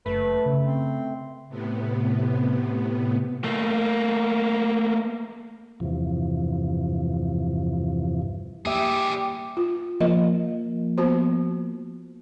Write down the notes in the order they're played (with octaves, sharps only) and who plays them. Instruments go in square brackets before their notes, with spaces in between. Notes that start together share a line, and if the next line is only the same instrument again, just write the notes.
[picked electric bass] F#1 [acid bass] A3 [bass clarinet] B4
[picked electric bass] C#3
[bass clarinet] C4
[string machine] A2 C3 B3
[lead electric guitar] A3 A#3
[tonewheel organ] E2 G2 C3 E3 F3
[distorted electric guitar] G3 G#4 [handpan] A#3 E5 [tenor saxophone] G4
[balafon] F4
[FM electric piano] F3 A#3 [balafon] D#5
[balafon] B3 F#4 C5